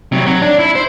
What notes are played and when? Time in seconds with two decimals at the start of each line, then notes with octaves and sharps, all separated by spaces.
0.12 C3 F#3
0.26 F#3
0.42 D4
0.59 E4
0.75 C5